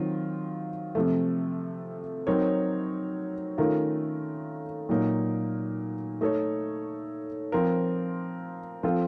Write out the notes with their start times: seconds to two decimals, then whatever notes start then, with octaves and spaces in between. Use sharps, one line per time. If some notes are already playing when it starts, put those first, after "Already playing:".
Already playing: D#3 F#3 C4 F4
0.95 C3 F3 A3
2.27 F#3 C4 D#4 A#4 C#5
3.58 D#3 A3 C#4 F4 A#4
4.89 A#2 F#3 A#3 D#4
6.21 A3 D#4 A4 C#5
7.52 F3 C4 F4 A#4
8.83 F3 C4 F4 A4